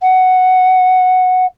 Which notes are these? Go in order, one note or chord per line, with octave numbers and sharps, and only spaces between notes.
F#5